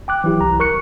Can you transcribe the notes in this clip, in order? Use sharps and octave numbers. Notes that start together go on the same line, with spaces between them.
G5 D6 F#6
E3 F#3 E4 G4
C2 A#5
A#4 C#6 F#6 C#7